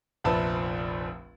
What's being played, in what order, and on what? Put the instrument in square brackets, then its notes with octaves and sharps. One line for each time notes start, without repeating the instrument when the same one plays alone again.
[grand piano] F1 A#1 F3 B4 E5 A5